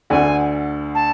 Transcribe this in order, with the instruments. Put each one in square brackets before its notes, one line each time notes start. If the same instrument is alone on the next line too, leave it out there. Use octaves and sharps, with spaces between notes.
[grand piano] D2 D3 [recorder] G#5
[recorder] A5